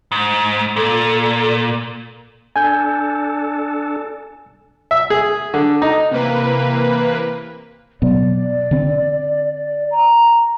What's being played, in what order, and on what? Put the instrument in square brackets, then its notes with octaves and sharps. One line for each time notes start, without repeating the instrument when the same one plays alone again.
[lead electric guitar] G#2
[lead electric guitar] A#2 [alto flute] A4
[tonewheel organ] D4 A4 [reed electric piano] G#5 G6
[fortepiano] E5
G#4
D3
D#4
[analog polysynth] C3 E3 A#3 B4
[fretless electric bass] B2 F#3 B3 [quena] D5
[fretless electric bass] D3 C4
[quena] A#5